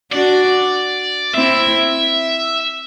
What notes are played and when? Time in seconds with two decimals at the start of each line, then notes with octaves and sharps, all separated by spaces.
0.12 D4 F#4 D5
1.34 C4 E4 E5